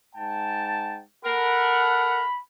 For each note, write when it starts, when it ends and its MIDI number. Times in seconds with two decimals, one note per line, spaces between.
0.15 1.00 44
0.15 1.00 79
0.15 1.00 81
1.25 2.26 69
1.25 2.23 70
1.25 2.26 78
1.25 2.40 83